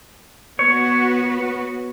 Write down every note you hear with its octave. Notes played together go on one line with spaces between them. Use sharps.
B3 F#4 B4 C#5